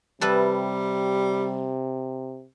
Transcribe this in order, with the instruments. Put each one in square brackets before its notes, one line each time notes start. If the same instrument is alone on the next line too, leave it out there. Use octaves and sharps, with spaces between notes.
[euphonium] C3 [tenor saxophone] G3 [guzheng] A4 B4 E5